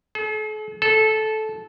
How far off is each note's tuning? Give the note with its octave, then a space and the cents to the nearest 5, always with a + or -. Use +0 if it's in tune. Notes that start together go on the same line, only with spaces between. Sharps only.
A4 -45
A4 -15